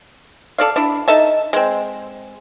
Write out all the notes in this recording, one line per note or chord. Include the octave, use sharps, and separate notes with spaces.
A4 D5 F5
D4 E4
D#4 A4 E5 A5
G#3 C4